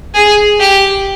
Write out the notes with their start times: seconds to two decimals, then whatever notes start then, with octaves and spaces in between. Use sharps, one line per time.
0.15 G#4
0.60 G4